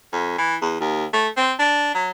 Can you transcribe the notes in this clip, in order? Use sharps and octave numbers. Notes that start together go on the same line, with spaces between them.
F2
E3
E2
D#2
A3
C4
D4
F#3